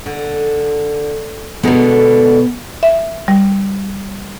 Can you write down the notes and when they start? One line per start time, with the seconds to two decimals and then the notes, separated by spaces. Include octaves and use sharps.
0.06 D3
1.63 B2 D3 G#3 B3 D#4
2.83 E5
3.28 G3